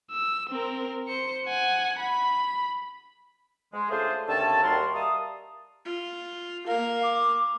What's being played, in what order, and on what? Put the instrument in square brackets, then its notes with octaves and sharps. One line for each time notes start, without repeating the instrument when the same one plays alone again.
[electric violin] E6
C4 A#4
C5 C#7
F#5 G#5
B5
[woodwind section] G#3
C#3 A3 D4 F4 G#4 C5
D#2 D3 C4 C#4 E5 A5
D#2 D#3 G3 F#4 A#4 C6
G3 A#4 E5 F5 A5 D#6
[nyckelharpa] F4
[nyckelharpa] A#3 A#4 [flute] F5
[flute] D6